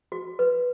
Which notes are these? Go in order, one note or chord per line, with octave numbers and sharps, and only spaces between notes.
F#4
B4